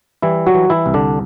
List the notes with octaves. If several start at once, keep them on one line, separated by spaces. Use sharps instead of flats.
E3 G3 E4
F#3 F#4
E3
E3 E4
C2
D3 D4